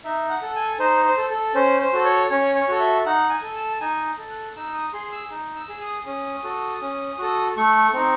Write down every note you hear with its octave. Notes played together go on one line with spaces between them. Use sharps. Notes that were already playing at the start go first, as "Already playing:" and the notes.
D#4 E5
F#5
A4
G#5
D#4 C5
C5
A4
A4
C#4 C5
C5
F#4 A4
C#5
C#4 C#5
C#5
F#4 A4
E5
D#4 F#5
G#5
A4
A5
D#4 G#5
A4
F#6
D#4 E6
D#6
G#4 C6
E6
D#4
E6
G#4
D#6
C#4 D#6
F#4 A4
C#4
F#4 A4
A3 C#6
C4 D#4